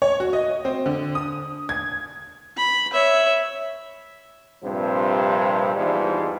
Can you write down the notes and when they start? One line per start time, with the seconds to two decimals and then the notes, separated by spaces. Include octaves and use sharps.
0.02 C#5
0.20 F#4
0.33 D#5
0.65 C4
0.86 D3
1.15 D#6
1.69 G#6
2.57 B5
2.93 C#5 E5
4.63 A#1 G2 C3 F3 C4
5.76 E2 G#2 F3 G3 E4